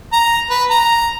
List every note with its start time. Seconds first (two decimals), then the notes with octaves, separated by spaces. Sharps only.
0.13 A#5
0.50 B4
0.71 A#5